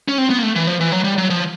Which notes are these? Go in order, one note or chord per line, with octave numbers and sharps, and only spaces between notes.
C#4
C4
B3
A#3
A3
E3
F3
E3
F#3
G3
F#3
F3